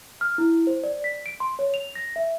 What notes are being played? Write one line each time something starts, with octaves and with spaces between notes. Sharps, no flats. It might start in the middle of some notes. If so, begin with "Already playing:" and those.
F6
E4
C5
D5
B6
D7
C6
C#5
F7
A#6
E5